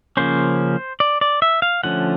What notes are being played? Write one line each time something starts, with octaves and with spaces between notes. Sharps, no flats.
C#3 F3 A#3 C#4 C5
D5
D5
E5
F5
D3 F3 A3 C#4 F#5